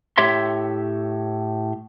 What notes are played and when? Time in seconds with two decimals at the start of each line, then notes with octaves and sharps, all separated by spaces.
0.18 A2 G4 C#5 E5 C6